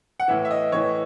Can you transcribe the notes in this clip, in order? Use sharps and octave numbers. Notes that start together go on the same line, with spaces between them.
F#5
A2 E3 E5
E5
D#5
A2 E3 C#5